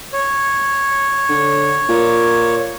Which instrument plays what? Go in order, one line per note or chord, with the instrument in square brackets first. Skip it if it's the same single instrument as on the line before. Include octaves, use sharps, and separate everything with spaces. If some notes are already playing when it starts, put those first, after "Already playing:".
[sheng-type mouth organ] C#5
[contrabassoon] D3
A#2